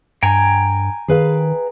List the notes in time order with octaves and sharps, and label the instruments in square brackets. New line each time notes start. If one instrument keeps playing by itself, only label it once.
[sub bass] G2 [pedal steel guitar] G5 G#5 A#5
[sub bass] D#3 [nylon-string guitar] G#4 B4 F5